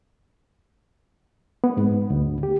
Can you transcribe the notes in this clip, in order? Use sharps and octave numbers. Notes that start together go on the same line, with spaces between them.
B3
G#2
D2
G4